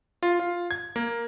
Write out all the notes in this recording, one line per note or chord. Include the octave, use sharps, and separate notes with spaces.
F4
F4
G#6
A#3